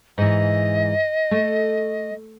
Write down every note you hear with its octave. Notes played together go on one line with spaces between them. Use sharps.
G#2 E3 D#5
A3